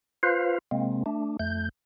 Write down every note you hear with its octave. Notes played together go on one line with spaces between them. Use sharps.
F4 B4 C5 F5
C3 G#3 A#3 C4
A3 D4
F2 A3 G6